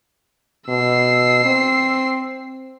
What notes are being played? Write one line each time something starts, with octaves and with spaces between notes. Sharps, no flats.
B2 E6 C7
C4